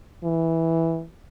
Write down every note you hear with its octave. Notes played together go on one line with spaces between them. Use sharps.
E3